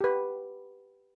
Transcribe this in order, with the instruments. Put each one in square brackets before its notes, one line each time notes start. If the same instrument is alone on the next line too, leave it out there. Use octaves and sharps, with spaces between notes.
[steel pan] G4 B4